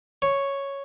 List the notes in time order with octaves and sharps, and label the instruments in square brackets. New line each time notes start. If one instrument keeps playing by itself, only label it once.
[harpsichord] C#5